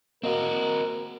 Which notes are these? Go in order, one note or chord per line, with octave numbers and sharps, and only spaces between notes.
A#3 C4 F#4 A#4 D#5